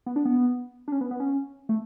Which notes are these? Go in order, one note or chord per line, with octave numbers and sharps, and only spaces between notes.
B3
D4
B3
D4
C#4
B3
B3
C#4
A3